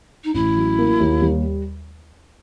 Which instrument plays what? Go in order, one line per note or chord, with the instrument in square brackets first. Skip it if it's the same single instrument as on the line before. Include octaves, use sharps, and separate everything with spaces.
[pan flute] D#4
[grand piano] A1 [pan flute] E4
[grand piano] F#3
A#3
D#2
G3